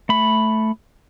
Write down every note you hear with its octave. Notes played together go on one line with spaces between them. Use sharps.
A3 B5